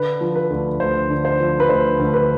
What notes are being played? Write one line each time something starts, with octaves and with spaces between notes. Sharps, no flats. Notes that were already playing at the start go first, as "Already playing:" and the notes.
Already playing: D3 B4
F3
B4
D2
D2 C5
D3
C5
F3
B4
D2 C5
D2
B4